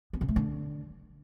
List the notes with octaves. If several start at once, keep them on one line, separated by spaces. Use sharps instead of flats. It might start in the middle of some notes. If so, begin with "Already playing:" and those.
B3
C#3
A3
D3